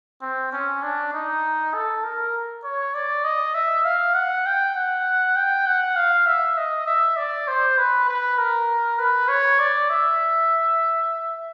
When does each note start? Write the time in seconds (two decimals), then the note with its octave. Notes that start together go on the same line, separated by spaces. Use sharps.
0.22 C4
0.52 C#4
0.82 D4
1.13 D#4
1.74 A4
2.04 A#4
2.64 C#5
2.94 D5
3.24 D#5
3.55 E5
3.85 F5
4.15 F#5
4.46 G5
4.75 F#5
5.36 G5
5.66 F#5
5.96 F5
6.26 E5
6.57 D#5
6.87 E5
7.17 D5
7.48 C5
7.78 B4
8.09 B4
8.38 A#4
8.99 B4
9.28 C#5
9.59 D5
9.90 E5